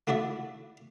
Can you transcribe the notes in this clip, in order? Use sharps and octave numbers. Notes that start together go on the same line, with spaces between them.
A3 E4 F#4 D5 E5